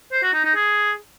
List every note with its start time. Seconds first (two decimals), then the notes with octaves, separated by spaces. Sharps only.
0.12 C5
0.23 F#4
0.34 D#4
0.44 D#4
0.55 G#4